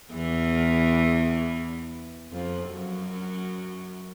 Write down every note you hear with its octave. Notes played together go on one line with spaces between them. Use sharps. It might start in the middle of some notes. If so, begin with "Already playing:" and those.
E2 E3
F2 F3
F#2 F#3